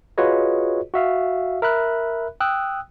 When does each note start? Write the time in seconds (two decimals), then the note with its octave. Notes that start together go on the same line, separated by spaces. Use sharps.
0.18 F4 F#4 G#4 B4 C#5 D#5
0.94 F#4 E5 F5
1.62 A#4 E5 B5 F#6
2.40 G5 D#6 E6 F#6